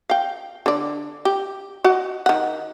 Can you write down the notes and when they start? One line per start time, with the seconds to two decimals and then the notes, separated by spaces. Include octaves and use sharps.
0.10 F5 G5
0.66 D3 D5
1.25 G4
1.84 F#4 D#5 F#5
2.26 D#3 F#5